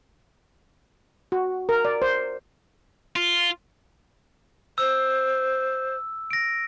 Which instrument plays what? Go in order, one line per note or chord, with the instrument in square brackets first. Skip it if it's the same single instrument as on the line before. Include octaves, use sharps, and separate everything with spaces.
[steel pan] F#4
A#4
D5
C5
[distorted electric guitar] F4
[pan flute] C5 [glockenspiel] E6
[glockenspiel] A#6 D7